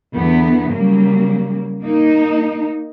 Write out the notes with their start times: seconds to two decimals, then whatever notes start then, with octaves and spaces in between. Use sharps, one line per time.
0.16 E2 D3 B3
0.74 C#3 F#3 G3 A#3
1.82 A#3 D#4